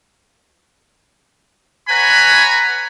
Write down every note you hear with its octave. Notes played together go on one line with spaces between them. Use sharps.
B4 C#5 F#5 G#5 A#5 B5